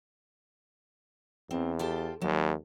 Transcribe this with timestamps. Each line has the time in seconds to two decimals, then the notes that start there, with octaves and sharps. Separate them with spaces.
1.51 E2 C4
1.79 F4 G4 A4
2.22 D#2 F#3